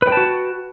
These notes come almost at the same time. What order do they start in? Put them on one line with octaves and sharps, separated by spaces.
B4 G5 A5 F#4